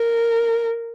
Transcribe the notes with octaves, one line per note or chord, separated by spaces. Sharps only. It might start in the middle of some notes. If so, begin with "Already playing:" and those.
Already playing: A#4